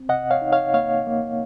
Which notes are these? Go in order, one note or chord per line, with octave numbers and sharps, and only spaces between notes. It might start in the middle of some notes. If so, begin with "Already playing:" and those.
Already playing: C4
C3 D#5 F#5
C#5 F5
D#4
C#5 F5
A#3 C#5 F5
A#3